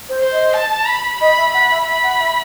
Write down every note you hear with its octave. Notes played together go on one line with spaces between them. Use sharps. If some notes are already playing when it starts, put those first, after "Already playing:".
C5
C5
D#5
A5
B5
D#5 B5
E5
F#5 B5
E5
E5 B5
F#5
E5